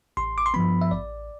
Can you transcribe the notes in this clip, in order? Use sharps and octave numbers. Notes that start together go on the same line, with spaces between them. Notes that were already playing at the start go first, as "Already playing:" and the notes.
A1 C6
D6
C6
G2 F3 B3 B5
E5
A1 D5